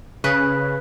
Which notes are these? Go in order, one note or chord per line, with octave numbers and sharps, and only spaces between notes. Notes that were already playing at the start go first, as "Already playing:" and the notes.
C#3 B4